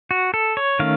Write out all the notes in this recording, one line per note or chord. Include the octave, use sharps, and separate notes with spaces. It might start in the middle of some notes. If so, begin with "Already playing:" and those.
F#4
A4
C#5
D#3 A3 C#4 F5